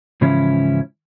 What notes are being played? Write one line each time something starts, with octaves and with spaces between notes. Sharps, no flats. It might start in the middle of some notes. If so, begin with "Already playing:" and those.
G#2 C#3 E3 F3 C#4 E4